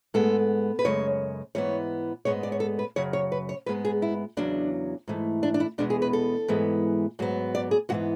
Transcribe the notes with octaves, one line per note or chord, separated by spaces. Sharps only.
G#2 G#3 B3 A4
B4
F#2 C#3 G#3 C#5
G#2 E3 B3 C#5
G#2 G#3 B3 C#5
D5
C#5
A4
B4
F#2 C#3 F#3 C#5
C#5
B4
C#5
G#2 G#3 B3 B4
G#4
E4
E2 C#3 F#3 D4
G#2 E3 A3
D4
D4
E4
E2 B2 G#3 B3 D4
G#4
B4
A4
G#2 E3 G#3 B3
G#2 F#3 B3
D5
G#4
G#2 E3 B3 F#4